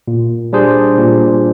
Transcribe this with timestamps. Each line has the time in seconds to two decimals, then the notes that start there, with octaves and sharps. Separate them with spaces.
0.08 A#2
0.53 G3 D4 G#4 C5
0.98 A#2